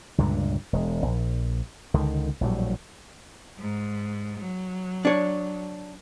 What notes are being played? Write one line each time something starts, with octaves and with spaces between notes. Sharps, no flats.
C#2 G2 A#2 D3
E1 G#3
A#1
C#2 D3 D#3
A#1 A2 F#3 G3
G#2
F#3
D4 C#5